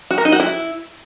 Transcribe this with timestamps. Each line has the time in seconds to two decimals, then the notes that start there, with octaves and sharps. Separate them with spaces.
0.11 F#4
0.18 A#4
0.25 D#4
0.32 F#4
0.40 E4